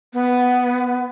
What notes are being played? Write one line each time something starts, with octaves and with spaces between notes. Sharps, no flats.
B3